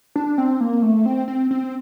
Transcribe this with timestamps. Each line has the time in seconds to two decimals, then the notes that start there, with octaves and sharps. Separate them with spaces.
0.16 D4
0.38 C4
0.61 A#3
0.82 A3
1.06 C4
1.28 C4
1.51 C4